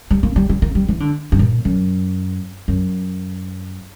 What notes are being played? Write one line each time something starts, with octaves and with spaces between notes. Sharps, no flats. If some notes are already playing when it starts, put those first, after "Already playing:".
G3
A#3
G3
G3
A#3
G3
E3
D3
G2
A#2
F#2
F#2